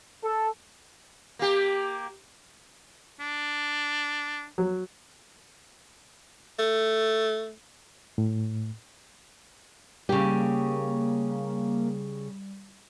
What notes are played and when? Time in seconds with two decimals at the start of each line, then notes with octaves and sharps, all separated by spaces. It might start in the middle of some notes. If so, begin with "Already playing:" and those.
0.23 A4
1.39 A#3 G4
3.20 D4
4.58 F#3
6.59 A3
8.18 A2
10.09 C#3 G3 A#3 G4